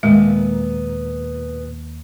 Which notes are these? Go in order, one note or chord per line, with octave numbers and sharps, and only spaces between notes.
D#2 A#2 G#3 B3